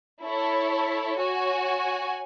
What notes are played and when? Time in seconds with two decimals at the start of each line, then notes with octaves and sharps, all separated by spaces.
0.23 E4 A4 C#5
1.18 F#4 C#5 G#5